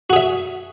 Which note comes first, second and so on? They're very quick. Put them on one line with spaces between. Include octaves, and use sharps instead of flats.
F#4 G#4 E5